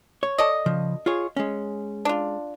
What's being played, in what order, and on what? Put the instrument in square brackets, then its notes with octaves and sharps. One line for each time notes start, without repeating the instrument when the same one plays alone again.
[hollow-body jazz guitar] C#5
[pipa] A4 D5 D#5
[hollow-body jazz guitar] C#3 F3
F4 G#4 C#5
G#3 C#4
[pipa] D4 F4